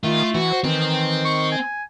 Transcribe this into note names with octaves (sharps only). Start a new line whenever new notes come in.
D#3 A3 F4
E3 F#4
C5
D#3 E3 C4
C#6
G#5